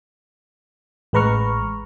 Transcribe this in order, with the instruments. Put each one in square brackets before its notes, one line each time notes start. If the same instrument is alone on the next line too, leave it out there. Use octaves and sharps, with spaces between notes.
[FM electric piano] A1 G#3 B4 A#5 C#6 F6